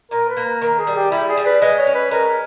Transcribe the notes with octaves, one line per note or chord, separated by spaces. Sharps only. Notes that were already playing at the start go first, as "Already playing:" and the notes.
A#2 A#4
B4
A#3
A#4
D#3 A#4
G#4
G3
G4
G3 E4
G#4
G3
B4
G#3 D#5
C#5
C#4
B4
G#3 A#4